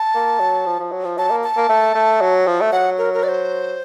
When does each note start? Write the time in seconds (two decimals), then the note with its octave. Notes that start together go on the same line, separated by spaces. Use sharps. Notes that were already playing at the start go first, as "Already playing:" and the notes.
Already playing: A5
0.15 A#3
0.40 F#3
0.66 F3
0.80 F3
0.92 F#3
1.05 F3
1.18 F#3 A5
1.31 A#3
1.44 A5
1.57 A#3
1.69 A3
1.95 A3
2.22 F#3
2.47 F3
2.61 A3
2.72 F#3 F#5
2.98 A#4
3.14 A#4
3.23 D5
3.28 C5